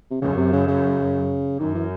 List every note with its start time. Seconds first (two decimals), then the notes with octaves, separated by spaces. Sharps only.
0.11 C3
0.22 F#2 C#3
0.37 C3
0.53 C#3
0.67 C#3
1.59 F#2 D#3
1.75 E3